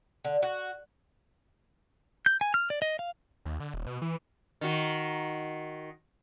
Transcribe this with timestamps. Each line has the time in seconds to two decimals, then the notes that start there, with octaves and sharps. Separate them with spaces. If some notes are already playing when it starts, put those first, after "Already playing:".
0.25 D3
0.42 F#4
2.26 G6
2.41 G#5
2.54 F6
2.70 D5
2.82 D#5
2.99 F5
3.45 D#2
3.60 D3
3.74 D#1
3.86 B2
4.02 E3
4.61 D#3 F#4